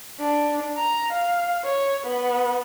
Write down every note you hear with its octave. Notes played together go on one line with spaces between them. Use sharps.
D4
A#5
F5
C#5
B3